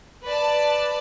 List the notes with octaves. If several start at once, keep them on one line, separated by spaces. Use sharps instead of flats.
B4 D5 A5